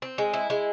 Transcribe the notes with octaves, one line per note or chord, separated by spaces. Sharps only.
C4
G#3
E4
G#3